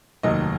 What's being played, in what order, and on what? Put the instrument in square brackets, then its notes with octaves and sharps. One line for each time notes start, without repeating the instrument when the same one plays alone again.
[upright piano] F1 D#2 D#3 F#3 D#5